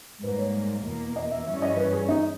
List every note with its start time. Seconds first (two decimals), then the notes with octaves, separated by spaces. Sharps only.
0.23 G#2 G3 A#3 B4
0.38 C#5
0.84 E2 B2 A#3
1.16 D#5
1.31 E5
1.47 G2 E3 G3 C#4 E5
1.62 D#5
1.77 B4
1.93 G#4
2.09 D#4